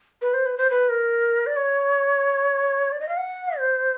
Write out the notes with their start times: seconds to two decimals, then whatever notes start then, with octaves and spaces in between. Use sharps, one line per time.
0.22 B4
0.34 C5
0.46 B4
0.58 C5
0.70 B4
0.89 A#4
1.46 D5
1.56 C#5
2.92 D5
3.00 D#5
3.09 F5
3.17 F#5
3.59 C5